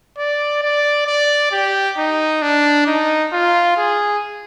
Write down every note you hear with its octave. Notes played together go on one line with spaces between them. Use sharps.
D5
D5
D5
G4
D#4
D4
D#4
F4
G#4